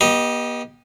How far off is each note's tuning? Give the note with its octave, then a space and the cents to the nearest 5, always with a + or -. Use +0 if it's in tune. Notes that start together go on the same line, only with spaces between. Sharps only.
B3 -45 G4 +0 D#5 +0